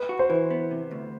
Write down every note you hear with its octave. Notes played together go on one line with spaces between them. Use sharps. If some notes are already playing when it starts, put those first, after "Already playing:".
Already playing: B4
F#4
C5
E3 B4
B3
C3
D2